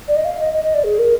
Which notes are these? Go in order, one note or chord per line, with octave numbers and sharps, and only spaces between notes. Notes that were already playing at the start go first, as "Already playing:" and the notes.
D5
D#5
F5
D#5
D#5
D#5
D5
G#4
A#4